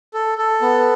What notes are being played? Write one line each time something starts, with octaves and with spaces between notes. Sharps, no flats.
A4
A4
B3